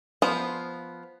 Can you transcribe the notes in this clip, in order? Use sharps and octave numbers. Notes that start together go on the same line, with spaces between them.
F3 B3 C5